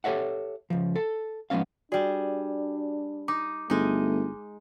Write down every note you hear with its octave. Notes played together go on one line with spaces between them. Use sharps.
G4 A4 C#5 E5 F#5
C#2 F3
A4
F3 G#3 B3 C#4 F5
G3 D4 F#4 G#4 D5
D#4 D6
G1 G#3 A3 D#4